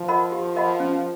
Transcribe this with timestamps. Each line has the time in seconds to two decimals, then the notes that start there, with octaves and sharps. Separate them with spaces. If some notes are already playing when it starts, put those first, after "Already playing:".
Already playing: F3
0.08 A#4 D#5 F#5 B5
0.32 G4
0.56 A#4 D#5 F#5 B5
0.80 C#4